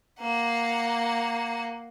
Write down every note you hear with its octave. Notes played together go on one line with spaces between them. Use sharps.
A#3 F#5